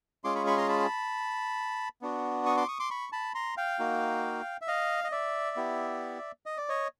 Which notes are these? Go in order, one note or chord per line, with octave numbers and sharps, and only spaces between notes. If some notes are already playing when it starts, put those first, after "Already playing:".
G#3 C#4 F4 G#4 C6 D6
B5 C#6
B5 C#6
A#5 C6
A5 B5
B3 D4 F#4
C#6 D#6
C6 D6
C#6 D#6
C6 D6
B5 C#6
A5 B5
A#5 C6
F5 G5
A#3 D#4 F#4
E5
D#5 F5
D#5
D5 E5
B3 E4 G4
D#5
D5
C#5 D#5